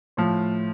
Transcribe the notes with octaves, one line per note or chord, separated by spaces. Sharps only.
A2 F3